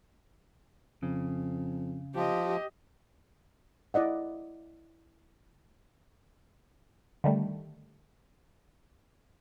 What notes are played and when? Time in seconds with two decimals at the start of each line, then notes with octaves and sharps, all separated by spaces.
1.03 F2 C#3
2.15 F3 G4 D#5
3.94 E4 D5 D#5 F#5
7.24 D3 D#3 G3 A3